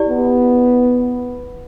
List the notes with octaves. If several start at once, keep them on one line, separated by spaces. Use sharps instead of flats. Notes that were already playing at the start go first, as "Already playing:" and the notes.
Already playing: E4 G4 D5
B3